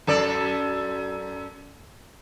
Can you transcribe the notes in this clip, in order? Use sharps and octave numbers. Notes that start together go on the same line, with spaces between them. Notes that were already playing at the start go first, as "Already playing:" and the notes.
F#2 A4 D5